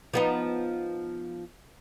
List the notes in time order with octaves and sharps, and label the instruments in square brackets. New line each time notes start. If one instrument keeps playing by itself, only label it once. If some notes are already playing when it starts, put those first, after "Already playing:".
[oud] F3 B3 D#4